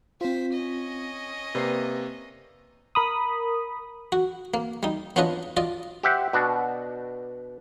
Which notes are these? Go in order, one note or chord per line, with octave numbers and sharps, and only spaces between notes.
C4 F4 C5 B6
C#4 D#5
C3 A#3 B4 D5 C7
A#4 B5 D#6
F#4
A#3
G3 D#4
B3 C#4 D4 F4 B4 D#5
F4 D5 D#5
G4 C5 E5 F#5
B2 D4 F#4